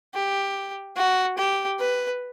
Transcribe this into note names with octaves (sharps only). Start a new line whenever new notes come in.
G4
F#4
G4
B4